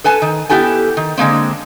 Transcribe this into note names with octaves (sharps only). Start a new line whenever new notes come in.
A4 B4 G#5 A5
D#3
B3 E4 G4 A4 G#5
D#3
D3 G#3 A#3 C4